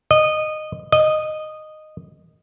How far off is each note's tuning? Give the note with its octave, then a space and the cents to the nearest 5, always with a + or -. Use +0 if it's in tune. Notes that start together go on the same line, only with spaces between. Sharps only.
D#5 -15
D#5 -10